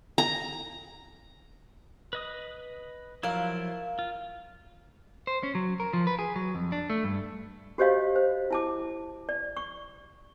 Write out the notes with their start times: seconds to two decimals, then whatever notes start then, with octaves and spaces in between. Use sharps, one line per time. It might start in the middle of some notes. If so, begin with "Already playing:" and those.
0.18 A#5
2.13 B4 D#5 D#6
3.23 F3 F#3 E4 A#4 F5
3.99 F4
5.27 C5
5.43 C#4
5.55 F#3
5.80 A#4
5.93 F3
6.07 B4
6.19 G#4
6.36 F#3
6.55 F2
6.72 D4
6.90 A3
7.04 G2
7.78 F#4 G4 C5 C#5 D#5 F5
8.16 C5
8.51 E4 A5 D6
9.29 D5
9.57 C#6